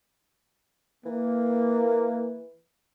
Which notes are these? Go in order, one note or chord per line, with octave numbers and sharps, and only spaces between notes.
E3 A#3